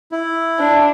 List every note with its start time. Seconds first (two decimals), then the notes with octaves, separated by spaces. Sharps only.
0.12 E4
0.59 D4